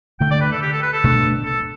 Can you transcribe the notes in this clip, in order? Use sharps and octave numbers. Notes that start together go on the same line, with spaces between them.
D2 D3 A3 G5
D5
B4
A4
G4
A4
B4
A4
B2 A3 D4
A4